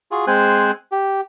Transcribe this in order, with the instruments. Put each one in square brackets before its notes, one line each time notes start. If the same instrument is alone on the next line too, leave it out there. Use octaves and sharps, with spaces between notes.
[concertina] F4 F#4 G#4
G#3 C4 C5 G#5 F#6
G4